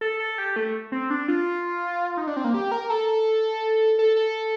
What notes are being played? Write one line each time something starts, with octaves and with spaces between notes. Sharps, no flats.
A4
A4
G4
A3
C4
D4
F4
D#4
D4
C4
A#3
G4
A#4
A4
A4
A4
A4